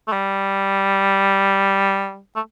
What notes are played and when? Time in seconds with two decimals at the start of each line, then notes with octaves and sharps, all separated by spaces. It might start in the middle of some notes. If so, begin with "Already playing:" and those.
0.08 A3
0.13 G3
2.36 A3